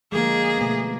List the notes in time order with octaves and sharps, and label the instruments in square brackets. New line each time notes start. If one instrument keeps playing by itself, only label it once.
[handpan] D3 F3 G#3 [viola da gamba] A#3 [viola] G#4
[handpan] B2 A3 B3